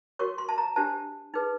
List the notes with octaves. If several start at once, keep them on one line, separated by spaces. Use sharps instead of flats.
F#4 A#4 C#5 C#6
C6
A5
A#5
D4 G4 C5 A5
D#4 G#4 B4